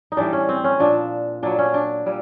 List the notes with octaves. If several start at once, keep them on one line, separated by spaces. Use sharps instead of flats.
D#4
A2 E3 G3 D4
C#4
C4
C#4
A#2 F3 D4
A#2 F#3 D4
C#4
D4
A#2 G3